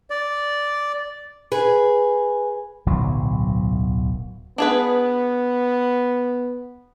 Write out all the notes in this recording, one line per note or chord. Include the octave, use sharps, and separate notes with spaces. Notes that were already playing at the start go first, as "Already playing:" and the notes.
D5
G#4 B4
D1 B1 F#3
B3 D4 G#4 B4